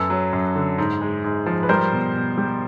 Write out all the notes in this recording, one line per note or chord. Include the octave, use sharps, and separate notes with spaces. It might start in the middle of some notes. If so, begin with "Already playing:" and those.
Already playing: F#2 A4 B4
F#3
F#2
D3
G#2
G#3
G#2
F3
B4
G3 A#4 C5
B2
B2
G3